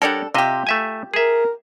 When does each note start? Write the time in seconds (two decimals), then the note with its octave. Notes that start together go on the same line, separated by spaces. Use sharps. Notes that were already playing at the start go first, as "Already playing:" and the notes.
0.02 G3 D4 A4 A#4 C#5 F#5
0.34 C3 F4 G4 D#5 E5
0.67 A3 E5 G#5
1.14 G#4 A#4 E5